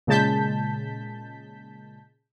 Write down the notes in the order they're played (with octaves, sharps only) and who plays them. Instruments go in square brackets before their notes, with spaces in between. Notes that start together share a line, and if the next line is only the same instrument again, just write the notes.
[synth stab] A#2 C#3 G#3 A5 G6 B6